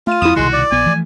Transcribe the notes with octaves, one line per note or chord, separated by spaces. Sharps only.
A3 F4 D#7
F2 F3 E4 D#6 E7
C2 B2 D#3 G#3 F#4 C6
D5
A#1 B3 G#5
E3 F3 A3